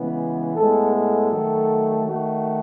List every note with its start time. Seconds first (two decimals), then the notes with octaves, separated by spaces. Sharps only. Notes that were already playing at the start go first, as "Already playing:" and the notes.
Already playing: C#3 E3 G#3 B3
0.56 A2 G#3 B3 A4
0.93 A4
1.31 D#3 F#3 A3
2.05 D#3 A3 F#4